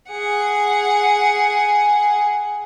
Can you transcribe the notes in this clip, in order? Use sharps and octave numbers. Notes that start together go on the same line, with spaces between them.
G#4 F#5